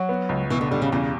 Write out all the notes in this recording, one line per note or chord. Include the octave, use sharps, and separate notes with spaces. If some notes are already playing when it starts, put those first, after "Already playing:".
Already playing: F#3 F#4
B3
C#2
B2 E3
D3
D3 G3
C#3
E2 C#3